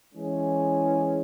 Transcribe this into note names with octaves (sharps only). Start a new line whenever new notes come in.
E3 G#3 C#4 G#4